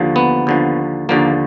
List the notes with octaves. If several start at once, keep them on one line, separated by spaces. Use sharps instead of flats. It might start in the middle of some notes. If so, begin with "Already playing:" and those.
Already playing: D#2 D3 F3
B3
D#2 D3 F3
D#2 D3 F3 A#3